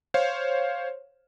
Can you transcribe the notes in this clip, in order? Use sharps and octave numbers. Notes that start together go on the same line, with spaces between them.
C5 C#5 F5